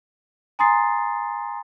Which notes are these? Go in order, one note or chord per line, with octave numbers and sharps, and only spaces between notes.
G#5 A#5 C6 D#6 A6 C7